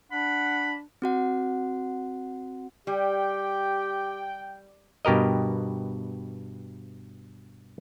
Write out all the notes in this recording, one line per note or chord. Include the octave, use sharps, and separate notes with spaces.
D4 F#5 B5
C4 F#4 F#5
G3 G4 G5
G2 B2 G4 A#4 D#5